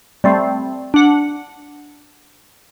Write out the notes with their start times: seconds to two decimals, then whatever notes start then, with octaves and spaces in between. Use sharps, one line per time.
0.24 G3 A3 C4
0.94 D4 F#5